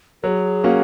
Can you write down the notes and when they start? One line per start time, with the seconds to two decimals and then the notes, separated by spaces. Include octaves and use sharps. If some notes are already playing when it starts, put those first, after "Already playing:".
0.23 F#3 G#4 A#4
0.64 A#3 C#4 F#4